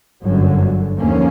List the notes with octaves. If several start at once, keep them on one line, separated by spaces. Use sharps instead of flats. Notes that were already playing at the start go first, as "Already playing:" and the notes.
G1 F#2 D3 F#3
D#2 D3 F3 A#3 C#4